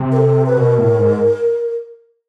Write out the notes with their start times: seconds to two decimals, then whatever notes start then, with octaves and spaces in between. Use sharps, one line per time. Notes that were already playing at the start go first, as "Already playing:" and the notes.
Already playing: C3
0.12 A#4
0.16 A4
0.46 B4
0.57 B2 A#4
0.78 A2
0.98 G#2